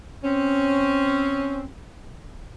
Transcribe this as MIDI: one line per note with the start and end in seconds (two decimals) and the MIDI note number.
0.24 1.65 60
0.24 1.65 61